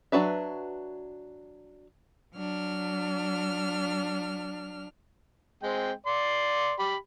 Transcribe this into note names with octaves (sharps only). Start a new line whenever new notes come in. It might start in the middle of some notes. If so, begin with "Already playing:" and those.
F#3 D4 F#4 B4 E5
F#3 D4 F6
G#3 C4 G5
D5 C6
G4 B5